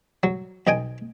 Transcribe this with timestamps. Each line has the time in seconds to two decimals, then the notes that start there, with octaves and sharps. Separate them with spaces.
0.23 F#3
0.67 B1 D#5 G5 G#5